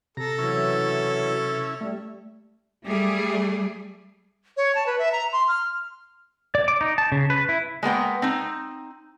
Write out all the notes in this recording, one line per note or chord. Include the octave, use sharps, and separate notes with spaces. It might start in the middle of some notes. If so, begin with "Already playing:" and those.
C3 A4 A#5
E3 F#3 C#4 E4
G3 A3
G3 A3 G#4
C#5
A5
B4
E5
A#5
C6
F6
D5
D6
D#4
A5
C#3
B4
E4
G#3 A#3 B3 G5
C4 D#4